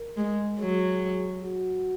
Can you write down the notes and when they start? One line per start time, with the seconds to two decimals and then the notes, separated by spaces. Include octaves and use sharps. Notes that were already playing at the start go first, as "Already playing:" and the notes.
Already playing: A#4
0.17 G#3
0.60 F#3 G#4
1.43 F#4